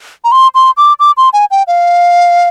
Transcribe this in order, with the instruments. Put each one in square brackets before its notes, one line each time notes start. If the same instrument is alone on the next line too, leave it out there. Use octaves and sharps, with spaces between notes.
[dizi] A#5
C6
C6
D6
D6
C6
G#5
G5
F5